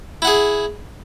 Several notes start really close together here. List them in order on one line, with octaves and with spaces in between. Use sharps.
E4 F#5 G#4